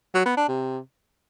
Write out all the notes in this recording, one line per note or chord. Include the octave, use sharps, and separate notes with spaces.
F#3
B3
D4
C3